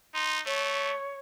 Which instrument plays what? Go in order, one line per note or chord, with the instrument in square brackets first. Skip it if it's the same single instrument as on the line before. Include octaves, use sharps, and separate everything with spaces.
[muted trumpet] D#4 [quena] C6
[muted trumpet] A3 [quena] C#5